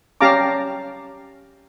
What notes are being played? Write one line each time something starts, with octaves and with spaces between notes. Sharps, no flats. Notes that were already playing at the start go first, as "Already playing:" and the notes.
C#4 G4 F5 A5 A#5 D6